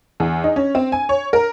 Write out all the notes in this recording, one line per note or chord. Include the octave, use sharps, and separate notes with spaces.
E2
D#4
C#4
C4
G#5
C#5
A#4